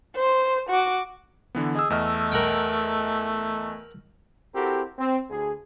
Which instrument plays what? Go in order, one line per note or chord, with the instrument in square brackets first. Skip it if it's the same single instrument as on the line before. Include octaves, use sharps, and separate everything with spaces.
[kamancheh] C5
F#4 D6
[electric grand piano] D3 E3 B3
[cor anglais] G#4 [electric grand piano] D#5 E6
[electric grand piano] E2 D#5 F6 [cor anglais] A3
[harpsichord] A#4 F#5 G5
[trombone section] C4 E4 F#4 G4 A4 A#4
C4
D2 G#4